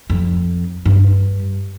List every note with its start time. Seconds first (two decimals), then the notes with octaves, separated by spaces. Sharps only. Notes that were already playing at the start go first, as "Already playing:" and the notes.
0.10 F2
0.86 G2